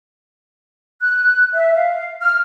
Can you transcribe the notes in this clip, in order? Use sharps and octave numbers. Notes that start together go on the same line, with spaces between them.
F#6
E5
F5
F6